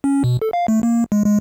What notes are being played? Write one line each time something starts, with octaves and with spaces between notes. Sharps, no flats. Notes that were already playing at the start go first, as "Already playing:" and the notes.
C#4
B2
A4
F5
A3
A#3
G#3
G#3